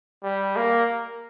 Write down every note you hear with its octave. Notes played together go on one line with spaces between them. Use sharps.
G3
A#3